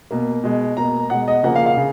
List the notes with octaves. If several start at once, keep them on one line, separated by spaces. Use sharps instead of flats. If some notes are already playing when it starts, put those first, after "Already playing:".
B2 A#3
B2 G#3
B2 A#3 A#5
B2 G#3 F#5
D#5
C#3 F3 A#3 F#5
F5
F5
C#3